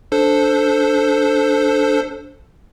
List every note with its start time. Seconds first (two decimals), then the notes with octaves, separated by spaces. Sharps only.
0.12 D4 A4 C5